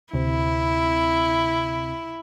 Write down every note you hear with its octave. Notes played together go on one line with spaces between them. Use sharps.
D2 C3 C4 E4